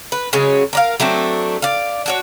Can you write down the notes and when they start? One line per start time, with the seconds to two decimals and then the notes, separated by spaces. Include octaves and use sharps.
0.12 B4
0.33 C#3 F#3 G#3 C#4
0.73 A#4 D5 F5
1.00 F#3 A3 C4 D4
1.62 D5 F5
2.06 D4 F#4 C#5